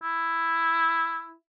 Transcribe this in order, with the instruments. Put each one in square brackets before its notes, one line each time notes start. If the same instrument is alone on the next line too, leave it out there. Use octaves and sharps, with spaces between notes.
[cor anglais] E4